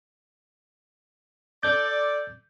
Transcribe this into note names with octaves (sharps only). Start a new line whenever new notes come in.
A4 D5 G6